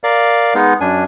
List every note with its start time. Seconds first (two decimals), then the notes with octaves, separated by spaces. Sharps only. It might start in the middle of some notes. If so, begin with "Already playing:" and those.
0.04 A#4 D5 F5
0.55 G#3 B3 D#4
0.81 F#2 D4 G#5